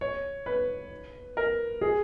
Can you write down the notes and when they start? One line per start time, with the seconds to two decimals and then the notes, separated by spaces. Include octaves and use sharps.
0.01 C#5
0.46 B4
1.37 A#4
1.81 G#4